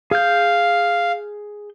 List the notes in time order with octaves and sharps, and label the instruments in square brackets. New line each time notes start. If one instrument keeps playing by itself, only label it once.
[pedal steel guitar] G#4 G6 [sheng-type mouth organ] F5